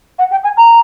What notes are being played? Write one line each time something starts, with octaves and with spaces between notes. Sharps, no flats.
F#5
G5
G#5
A#5